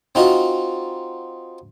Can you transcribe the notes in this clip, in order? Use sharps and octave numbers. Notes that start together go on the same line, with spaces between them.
C4 D#4 F4 F#4 D#5